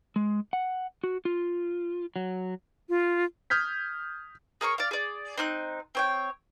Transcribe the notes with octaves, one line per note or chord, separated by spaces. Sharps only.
G#3
F#5
F#4
F4
F#3
F4
D#6 F6 G6 G#6 B6
G#4 A#4 C#5 C#6
D5 F5
G#4 D5
C4 D#4 F#6
C4 C#5 G5